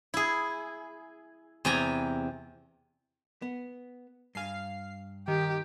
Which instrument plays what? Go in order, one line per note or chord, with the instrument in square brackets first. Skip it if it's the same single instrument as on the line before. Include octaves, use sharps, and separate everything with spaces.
[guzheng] E4 G#4
E2 C3 G5 G#5 A#5
[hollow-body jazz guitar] B3
[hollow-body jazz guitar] G2 G#5 [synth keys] F5 C7
[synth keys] D#3 [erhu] G4